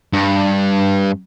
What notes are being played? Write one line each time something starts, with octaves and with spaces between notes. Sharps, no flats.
G2